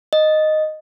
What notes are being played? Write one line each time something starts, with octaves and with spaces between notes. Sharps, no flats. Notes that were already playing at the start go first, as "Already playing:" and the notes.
D#5